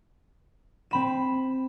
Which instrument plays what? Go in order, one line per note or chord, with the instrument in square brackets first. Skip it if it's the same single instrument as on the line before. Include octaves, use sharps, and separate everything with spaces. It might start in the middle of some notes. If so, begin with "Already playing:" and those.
[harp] C4 B5 E7